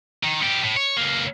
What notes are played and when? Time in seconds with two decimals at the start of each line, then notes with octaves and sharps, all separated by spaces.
0.24 D#3
0.41 B3 G4
0.63 A2
0.77 C#5
0.97 C#2 A#3